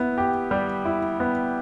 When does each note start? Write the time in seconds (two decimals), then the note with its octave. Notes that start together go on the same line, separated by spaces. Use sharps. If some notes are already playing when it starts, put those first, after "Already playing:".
Already playing: B3 E4
0.18 G4
0.51 G3
0.85 E4
1.20 B3